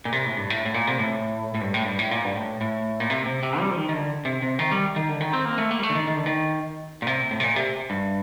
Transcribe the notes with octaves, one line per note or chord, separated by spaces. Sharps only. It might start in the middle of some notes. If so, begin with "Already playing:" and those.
A#2
C3
A2
G2
A2
A2
A#2
C3
A2
A2
G2
A2
G2
A2
A#2
G2
A2
A2
A#2
C3
C3
C3
G3
F3
D#3
D#3
D3
C3
C3
D#3
G3
D#3
D3
D#3
C4
A#3
A3
A#3
G3
A3
D3
D#3
D#3
D3
D#3
A#2
C3
A2
C3
A#2
C3
G2